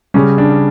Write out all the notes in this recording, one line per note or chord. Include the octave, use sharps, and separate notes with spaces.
C#3 G3 C#4
D4